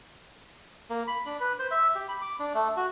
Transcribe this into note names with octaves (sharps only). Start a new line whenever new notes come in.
A#3
B5
D4
B4
C5
E5
G4
B5
D6
D4
A3
F#4